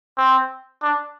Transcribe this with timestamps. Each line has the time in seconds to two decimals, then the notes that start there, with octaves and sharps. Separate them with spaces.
0.18 C4
0.82 D4